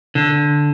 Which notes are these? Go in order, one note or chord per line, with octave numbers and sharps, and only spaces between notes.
D3